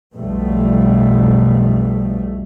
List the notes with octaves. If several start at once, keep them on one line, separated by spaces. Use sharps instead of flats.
B1 F2 B2 G3 A3